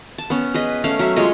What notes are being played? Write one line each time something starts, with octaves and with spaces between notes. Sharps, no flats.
A5
B3 C#4
G#4 B4 D#5
A3 C#4 F5
F#3 E5
G#3 F4 C#5 D#5